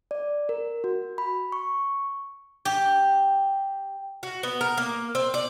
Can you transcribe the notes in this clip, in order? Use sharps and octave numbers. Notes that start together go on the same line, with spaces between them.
D5
A#4
F#4
B5
C#6
G4
F#4
B3
A#4
A#3
C4
D5